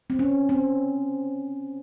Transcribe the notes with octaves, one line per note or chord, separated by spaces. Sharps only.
C4
C#4
C4